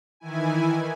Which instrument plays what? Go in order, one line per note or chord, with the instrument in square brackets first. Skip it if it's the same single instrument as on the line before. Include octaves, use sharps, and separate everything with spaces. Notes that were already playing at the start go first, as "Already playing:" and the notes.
[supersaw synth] D#3 E3 E4 G#5